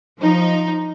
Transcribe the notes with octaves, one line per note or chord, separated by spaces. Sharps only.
F3 D#4